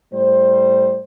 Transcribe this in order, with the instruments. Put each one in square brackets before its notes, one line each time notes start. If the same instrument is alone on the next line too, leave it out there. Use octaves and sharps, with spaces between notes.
[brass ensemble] A2 G3 C5